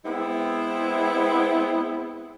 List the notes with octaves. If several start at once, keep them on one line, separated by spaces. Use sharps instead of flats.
G#3 B3 C4 E4